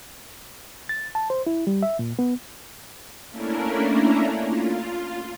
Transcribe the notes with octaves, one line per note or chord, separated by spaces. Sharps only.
A6
A5
C5
E4
G3
E5
A#2
B3
A3 A#3 C#4 D4 E4 A#4
F4